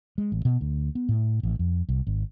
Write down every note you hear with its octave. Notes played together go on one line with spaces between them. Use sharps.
G#3
A1
B2
D2
B3
A2
A1
F2
C2
G#1